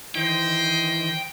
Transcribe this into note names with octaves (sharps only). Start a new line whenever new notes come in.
D#3 E3 C5 D#5 G5